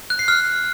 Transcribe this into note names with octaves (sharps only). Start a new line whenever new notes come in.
F#6
C7
F6